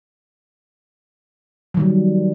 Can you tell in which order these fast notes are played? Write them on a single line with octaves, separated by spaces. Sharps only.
F#3 D#3 G3